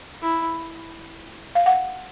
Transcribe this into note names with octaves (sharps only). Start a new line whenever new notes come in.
E4
F5
F#5